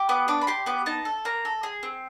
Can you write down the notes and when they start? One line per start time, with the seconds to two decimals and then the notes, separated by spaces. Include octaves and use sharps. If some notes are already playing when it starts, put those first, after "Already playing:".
Already playing: G4
0.09 B3 D6
0.28 D4 D6
0.41 B5
0.47 G4 C6
0.66 B3 D6
0.86 D#4 A5
1.05 A4
1.25 A#3 A#5
1.45 A4
1.63 G#4
1.83 C4